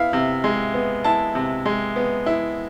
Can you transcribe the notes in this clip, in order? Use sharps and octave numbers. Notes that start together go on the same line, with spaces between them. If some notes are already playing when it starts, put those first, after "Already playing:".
Already playing: B3 E4 F5
C3
G#3
B3
E4 A5
C3
G#3
B3
E4